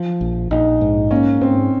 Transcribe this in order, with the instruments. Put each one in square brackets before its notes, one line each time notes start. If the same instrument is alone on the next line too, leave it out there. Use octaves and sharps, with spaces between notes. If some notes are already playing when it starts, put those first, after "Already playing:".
Already playing: [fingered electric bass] F3
A#1
[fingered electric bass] A#1 [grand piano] D#4
[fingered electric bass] G#2
[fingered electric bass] A#3 [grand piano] C#4
[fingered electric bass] G#2 [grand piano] C4